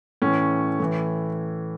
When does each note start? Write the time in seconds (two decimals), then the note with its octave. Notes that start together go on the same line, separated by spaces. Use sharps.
0.22 A2 E3 C#4
0.79 A2 E3